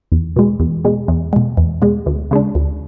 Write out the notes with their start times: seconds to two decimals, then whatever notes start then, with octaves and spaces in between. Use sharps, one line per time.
0.12 E2
0.36 B2 G#3
0.60 E2
0.84 B2 G#3
1.08 E2
1.33 B2 G#3
1.57 E2
1.82 B2 G#3
2.06 D2
2.31 C#3 G#3 D4
2.55 D2